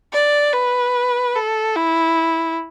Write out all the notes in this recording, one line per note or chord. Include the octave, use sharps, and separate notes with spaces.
D5
B4
A4
E4